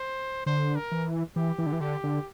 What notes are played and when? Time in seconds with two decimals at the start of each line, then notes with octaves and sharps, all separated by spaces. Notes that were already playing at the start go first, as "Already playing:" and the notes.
Already playing: C5
0.46 D3 C5
0.76 A#4
0.92 E3
1.36 E3 G4
1.58 E3
1.66 D3
1.73 E3
1.80 D3 G4
2.04 D3